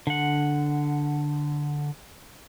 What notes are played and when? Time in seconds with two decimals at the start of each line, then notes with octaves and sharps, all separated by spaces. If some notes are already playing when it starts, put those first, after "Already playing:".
0.07 D3 F#5